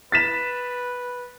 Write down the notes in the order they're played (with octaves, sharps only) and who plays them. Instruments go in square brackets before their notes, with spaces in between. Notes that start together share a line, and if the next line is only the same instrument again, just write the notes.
[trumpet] B4 [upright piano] A6 B6 E7